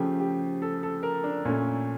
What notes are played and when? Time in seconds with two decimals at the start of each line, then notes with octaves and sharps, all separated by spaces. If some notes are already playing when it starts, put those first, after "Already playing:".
Already playing: C#3 F3 A3 G4
0.20 G4
0.62 A4
0.83 A4
1.03 A#4
1.24 D4
1.45 A#2 A3 C#4